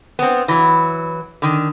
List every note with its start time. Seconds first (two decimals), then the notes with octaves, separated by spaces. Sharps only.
0.19 B3 C4
0.48 E3 F#3
1.42 D3 D#3